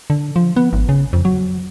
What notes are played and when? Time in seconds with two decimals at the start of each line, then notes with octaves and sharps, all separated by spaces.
0.10 D3
0.36 F3
0.57 B3
0.73 G#1
0.89 C#3
1.13 F2
1.25 F#3